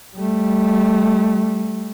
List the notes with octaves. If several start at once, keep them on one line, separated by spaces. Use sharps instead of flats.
G3 A3